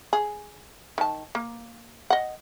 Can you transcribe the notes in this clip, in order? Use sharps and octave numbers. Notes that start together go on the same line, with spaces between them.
G#4
D#3 A5
A#3
D#5 F#5